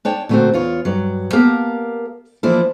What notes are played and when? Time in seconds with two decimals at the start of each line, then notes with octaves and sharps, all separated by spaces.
0.05 D4 C#5 G5 A5
0.29 A#2 D3 A3 A#3 C4 F#4
0.53 E2 F4 C#5
0.85 G2 F#3
1.33 A#3 B3 G4 A#4 F5 A5
2.43 E3 F3 A#3 D4 E4